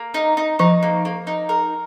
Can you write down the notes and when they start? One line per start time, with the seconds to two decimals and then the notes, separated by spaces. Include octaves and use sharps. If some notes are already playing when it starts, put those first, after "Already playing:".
Already playing: A#3
0.14 D#4
0.37 D#4
0.59 F3 D#4
0.83 A#3
1.05 A#3
1.27 D#4
1.49 A#4